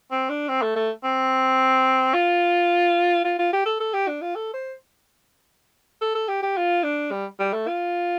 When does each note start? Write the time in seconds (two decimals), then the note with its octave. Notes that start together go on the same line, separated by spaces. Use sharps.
0.12 C4
0.29 D4
0.48 C4
0.62 A3
0.76 A3
1.04 C4
2.14 F4
3.25 F4
3.39 F4
3.53 G4
3.66 A4
3.80 A4
3.94 G4
4.08 D4
4.21 F4
4.36 A4
4.54 C5
6.02 A4
6.15 A4
6.28 G4
6.42 G4
6.57 F4
6.83 D4
7.11 G3
7.40 G3
7.53 A3
7.68 F4